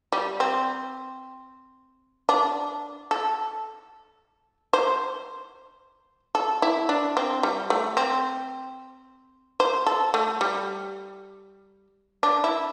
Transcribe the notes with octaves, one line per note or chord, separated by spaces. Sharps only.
G3
C4
D4
A4
C5
A4
E4
D4
C4
G3
A3
C4
C5
A4
A3
G3
D4
E4